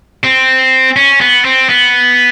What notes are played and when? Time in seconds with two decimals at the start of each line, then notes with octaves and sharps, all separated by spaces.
0.24 C4
0.96 C#4
1.21 B3
1.45 C4
1.69 B3